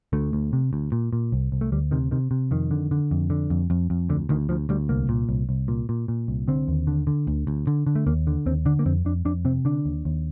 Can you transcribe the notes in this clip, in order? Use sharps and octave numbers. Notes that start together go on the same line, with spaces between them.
D2 A3
D2
C3
D2
A#2
A#2
C2
C2
A3
D2 G3
C3 D#3
C3 D#3
C3
F2 D#3
D3
D3
F2
D3
F2
F2
F2
D2 D3
D2 D#3
D2 F3
D2 G3
C2 A#3
A#2
C2
C2
A#2
A#2
A#2
C2
D3 C4
D#2
D3
D3
D2
D2
D3
D3
A3
D#2 A#3
D3
D#2 C4
D3 D4
A#3
F2 C4
F2 D4
F2 D4
C3 C4
D3 D4
D#2
D#2